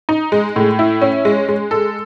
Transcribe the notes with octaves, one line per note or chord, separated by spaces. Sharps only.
D#4
G#3
A2
E4
C#4
G#3
G#3
A4